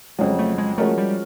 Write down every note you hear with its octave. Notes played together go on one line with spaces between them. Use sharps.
F2 C#3 F#3 G#3
A3
G#3
F3 G#3 A3 C#4 F#4 A#4
G3